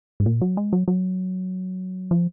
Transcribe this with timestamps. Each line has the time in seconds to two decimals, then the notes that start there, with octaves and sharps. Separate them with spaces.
0.20 G#2
0.26 A#2
0.42 F#3
0.57 G#3
0.73 F#3
0.88 F#3
2.11 F3